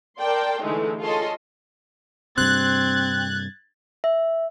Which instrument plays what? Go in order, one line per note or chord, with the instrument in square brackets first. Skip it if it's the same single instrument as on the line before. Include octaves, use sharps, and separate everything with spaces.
[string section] A#4 D5 G5 A5 C6
D3 E3 G#3 A3 D#4
F4 G#4 A4 C#5 D#5 C6
[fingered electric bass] G2 C3 [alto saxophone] C4 [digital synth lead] F#6 [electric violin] G#6 A6
[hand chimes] E5